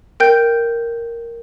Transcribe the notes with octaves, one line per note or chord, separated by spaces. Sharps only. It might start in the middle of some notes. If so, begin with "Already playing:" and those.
A#4 G5 G6